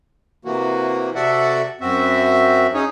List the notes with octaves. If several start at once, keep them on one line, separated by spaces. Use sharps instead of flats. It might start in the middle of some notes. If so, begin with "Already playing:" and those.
C3 E3 A#3 F#4
C3 F#4 A4 D5 E5 F#5
F#2 C4 F#4 E5
C#4 D#4 G#4 C#5